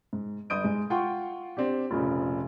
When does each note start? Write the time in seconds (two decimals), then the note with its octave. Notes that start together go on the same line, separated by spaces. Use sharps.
0.13 G#2
0.50 G1 D#6 G6 D7
0.64 G#2 G#3
0.90 F4 F#5 G5 C6 C#6
1.57 C4 D4 G4
1.91 F1 A#2 C#3 F3